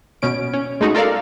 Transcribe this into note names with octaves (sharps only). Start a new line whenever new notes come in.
B2 C#4 D7
C#4
G#3 A3 D#4 F#4
F4 A4 A#4 D5 F5